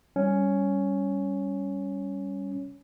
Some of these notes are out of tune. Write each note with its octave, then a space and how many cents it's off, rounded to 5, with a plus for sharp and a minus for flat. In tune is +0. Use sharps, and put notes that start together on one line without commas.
G3 +0 C#4 +5